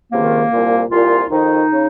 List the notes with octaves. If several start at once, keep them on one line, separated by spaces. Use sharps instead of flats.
C#2 C3 D#3 A#3
C2 A#2
C2 A#2 F4
F2 D#3 D#4
C#3